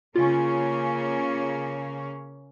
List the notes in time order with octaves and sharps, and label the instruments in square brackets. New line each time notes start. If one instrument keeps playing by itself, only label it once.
[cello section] C#3 A#3 C#4 [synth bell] F4